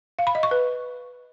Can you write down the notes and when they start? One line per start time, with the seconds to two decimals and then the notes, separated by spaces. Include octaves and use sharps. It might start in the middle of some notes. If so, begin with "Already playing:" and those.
0.19 F5
0.27 B5
0.35 D#5
0.43 C#6
0.51 B4